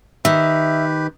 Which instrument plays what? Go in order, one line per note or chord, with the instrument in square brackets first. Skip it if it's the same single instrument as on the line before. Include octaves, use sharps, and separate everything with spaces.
[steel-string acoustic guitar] D#3 [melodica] G4 B4 [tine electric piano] E5